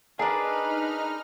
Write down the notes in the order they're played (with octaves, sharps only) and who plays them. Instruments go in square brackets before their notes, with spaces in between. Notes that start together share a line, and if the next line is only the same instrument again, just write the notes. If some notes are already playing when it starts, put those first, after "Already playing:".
[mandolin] D4 G#4 [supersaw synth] D#4 F6 [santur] A#4 A5 [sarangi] B4